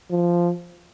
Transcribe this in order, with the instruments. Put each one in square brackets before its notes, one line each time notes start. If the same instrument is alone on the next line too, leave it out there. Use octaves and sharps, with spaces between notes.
[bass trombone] F3